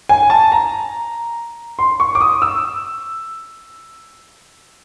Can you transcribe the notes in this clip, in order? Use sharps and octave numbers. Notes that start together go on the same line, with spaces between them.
G#5
A5
A#5
C6
C#6
D6
D#6
E6